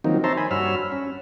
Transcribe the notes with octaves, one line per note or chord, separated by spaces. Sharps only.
D#3 F3 F#3 A#3 C4 D#4
C5 C#5 E5 A5 A#5 C6
G#5 B5
G2 F#4 C#5 B5 E6 F6
C#4